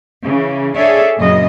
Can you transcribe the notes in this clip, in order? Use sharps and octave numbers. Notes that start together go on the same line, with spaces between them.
C#3 E3
D4 G#4 A4 C#5 D5 E5
F#2 A#2 C#3 D#5